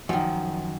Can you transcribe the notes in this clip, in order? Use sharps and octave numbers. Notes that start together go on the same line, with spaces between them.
F#2 D#3 F3